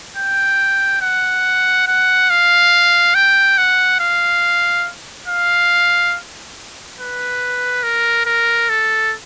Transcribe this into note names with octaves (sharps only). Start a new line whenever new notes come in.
G5
F#5
F#5
F5
G5
F#5
F5
F5
B4
A#4
A#4
A4